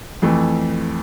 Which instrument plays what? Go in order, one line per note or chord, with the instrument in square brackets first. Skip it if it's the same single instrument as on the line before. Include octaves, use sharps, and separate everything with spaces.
[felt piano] F2 E3 A3